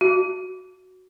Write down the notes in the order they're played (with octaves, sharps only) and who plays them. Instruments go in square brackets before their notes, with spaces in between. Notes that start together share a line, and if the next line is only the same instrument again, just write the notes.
[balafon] F#4